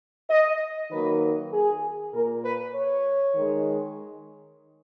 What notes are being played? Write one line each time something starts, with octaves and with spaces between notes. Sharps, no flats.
D#5
D#3 F#3 A#3 B4
G#4
A#2 A#3 A#4
B4
C#5
D#3 G#3